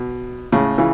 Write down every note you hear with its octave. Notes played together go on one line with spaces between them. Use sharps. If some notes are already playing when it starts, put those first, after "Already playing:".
Already playing: B2
A2 C#3
C#3 E3